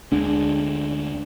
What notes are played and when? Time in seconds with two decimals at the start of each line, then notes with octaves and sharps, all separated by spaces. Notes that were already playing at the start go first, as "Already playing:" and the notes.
0.12 D2 D3 G#3 D4